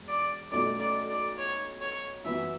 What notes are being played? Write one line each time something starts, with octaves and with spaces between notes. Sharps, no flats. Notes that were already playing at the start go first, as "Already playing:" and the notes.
Already playing: E1
D5
B1 B2 A3 C#4 D5
D5
D5
C#5
C#5
F#2 E3 B3 F#4 E5